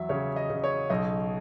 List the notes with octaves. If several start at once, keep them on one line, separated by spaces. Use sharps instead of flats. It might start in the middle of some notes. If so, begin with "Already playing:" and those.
Already playing: E2 F#3 E5
C#3 C#5
D#5
C#3
C#5
B1 D#5